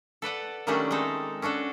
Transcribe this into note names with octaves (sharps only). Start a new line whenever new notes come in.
A4 B4 D5 F#5
D#3 F#3 G3 A3 C#4 D4
G#3 C4 D#4 A4
C#4 D4 F#4 A4